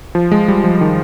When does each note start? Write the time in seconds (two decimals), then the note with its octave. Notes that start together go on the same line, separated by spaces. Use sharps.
0.15 F3
0.32 G#3
0.48 G3
0.64 F3
0.81 D#3